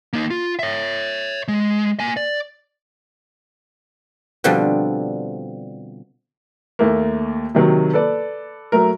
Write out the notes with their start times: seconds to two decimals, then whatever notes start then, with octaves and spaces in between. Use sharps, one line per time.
0.13 A#3 D#4
0.30 F4
0.59 C#5 E5
1.48 G#3
2.00 A#3 G#5
2.17 D5
4.44 B2 D3 F3 G3 C4
6.79 D#2 A3 A#3
7.55 C3 D#3 F#3
7.93 A4 B4 D5
8.72 F#3 A3 A#4